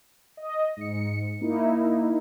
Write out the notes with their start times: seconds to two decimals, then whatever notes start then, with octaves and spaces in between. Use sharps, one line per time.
0.37 D#5
0.77 G#2 C#7
1.41 A#3 D#4 E4